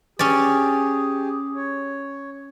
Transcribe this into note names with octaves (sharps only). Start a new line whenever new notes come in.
C#4 G4 G#4 D5
C#5